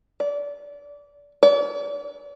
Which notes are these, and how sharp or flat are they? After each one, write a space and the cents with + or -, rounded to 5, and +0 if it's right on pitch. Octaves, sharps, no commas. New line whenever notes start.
D5 -25
D5 -45